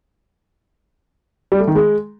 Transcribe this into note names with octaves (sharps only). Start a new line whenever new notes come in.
G3
A3
D#3
G#3